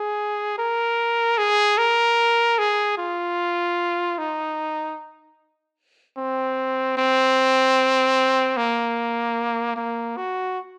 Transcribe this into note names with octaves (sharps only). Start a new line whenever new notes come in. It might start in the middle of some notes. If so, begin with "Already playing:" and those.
Already playing: G#4
A#4
G#4
A#4
G#4
F4
D#4
C4
C4
A#3
A#3
F#4